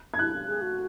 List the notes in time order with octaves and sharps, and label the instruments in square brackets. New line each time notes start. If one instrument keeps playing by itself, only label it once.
[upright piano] G#6
[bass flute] E4 [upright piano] F#6
[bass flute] G#4
F#4